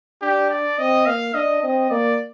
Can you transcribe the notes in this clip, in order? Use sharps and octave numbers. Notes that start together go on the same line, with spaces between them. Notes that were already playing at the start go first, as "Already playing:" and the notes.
D4 G4
D5
C4 D#5
A#3 F5
D4 D#5
C4 D#5
A#3 D5